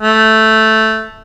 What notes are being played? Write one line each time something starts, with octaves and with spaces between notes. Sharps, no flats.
A3